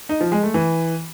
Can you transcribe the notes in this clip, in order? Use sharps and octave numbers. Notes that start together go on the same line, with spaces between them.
D#4
F3
G#3
A3
E3